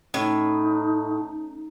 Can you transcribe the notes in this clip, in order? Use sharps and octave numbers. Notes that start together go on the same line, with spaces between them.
A2 C#4 D#4